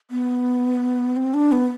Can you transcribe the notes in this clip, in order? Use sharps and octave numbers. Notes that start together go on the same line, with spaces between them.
B3
C4
D4
B3